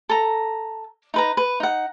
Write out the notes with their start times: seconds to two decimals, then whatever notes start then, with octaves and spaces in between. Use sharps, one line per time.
0.09 A4 A#5
1.14 D#4 B4 A#5
1.37 B4
1.60 D#4 F#5